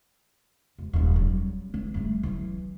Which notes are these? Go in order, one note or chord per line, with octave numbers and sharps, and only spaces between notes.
E1
D#1 F#2
F#3 G3
E3 D4
G3 A3
E3 F#3